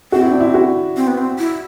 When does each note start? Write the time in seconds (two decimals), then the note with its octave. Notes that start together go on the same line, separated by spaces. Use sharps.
0.12 C4 F#4
0.21 E4
0.31 D4
0.40 E4
0.54 F#4
0.97 C4
1.07 B3
1.18 C4
1.39 E4